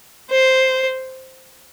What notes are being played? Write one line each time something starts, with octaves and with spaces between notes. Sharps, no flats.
C5